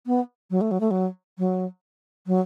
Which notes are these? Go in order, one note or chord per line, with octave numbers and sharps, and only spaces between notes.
B3
F#3
A3
F#3
A3
F#3
F#3
F#3